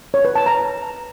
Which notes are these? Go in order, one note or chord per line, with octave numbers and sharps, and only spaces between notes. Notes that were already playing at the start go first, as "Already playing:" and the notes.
C#5
B4
A5
A#5